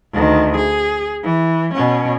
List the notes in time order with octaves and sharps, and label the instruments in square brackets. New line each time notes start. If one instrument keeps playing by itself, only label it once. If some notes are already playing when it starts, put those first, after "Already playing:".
[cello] D2 D#3
G#4
E3
B2 C#4